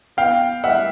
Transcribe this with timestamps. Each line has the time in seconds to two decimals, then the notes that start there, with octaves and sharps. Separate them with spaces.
0.17 B3 F5 G5
0.64 G3 E5 F#5